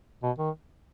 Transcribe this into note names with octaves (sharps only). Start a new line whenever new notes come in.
B2
D#3